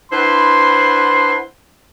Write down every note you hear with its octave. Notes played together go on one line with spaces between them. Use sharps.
D4 E4 B4 C5 F#5 C6